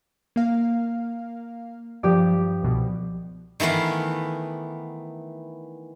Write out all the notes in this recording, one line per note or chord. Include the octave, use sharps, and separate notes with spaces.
A#3 F5
G2 F3 G4 D5
C2 B2
D#3 E3 A3 B3 F5